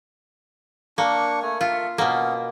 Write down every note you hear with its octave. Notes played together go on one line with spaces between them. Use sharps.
A#3 D4 C#6
A3 G#5
F4 A4 E5
B2 A#3 B3 C#4